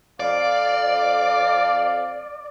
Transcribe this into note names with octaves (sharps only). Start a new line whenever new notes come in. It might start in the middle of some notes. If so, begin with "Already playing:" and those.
F2 D5 F5 D6